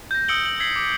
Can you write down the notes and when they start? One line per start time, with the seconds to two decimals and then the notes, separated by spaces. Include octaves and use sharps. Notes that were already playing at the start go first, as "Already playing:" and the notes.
0.11 G6 A#6
0.28 D#6 E6 C#7 D7 F#7 G7
0.46 F#7
0.60 E6 G#6 B6 C7 F#7 G7
0.76 D6